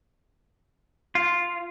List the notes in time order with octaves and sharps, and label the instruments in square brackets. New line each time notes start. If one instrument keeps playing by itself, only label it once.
[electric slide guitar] F4